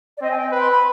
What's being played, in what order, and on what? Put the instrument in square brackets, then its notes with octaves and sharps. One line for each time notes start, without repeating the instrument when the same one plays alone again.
[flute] D5
[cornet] C4 [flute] D#5
[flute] G#5
G5
[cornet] B4
[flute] C6
B5